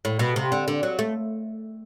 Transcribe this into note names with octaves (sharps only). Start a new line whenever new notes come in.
A2
B2
C3
D3
D3
F#3
A3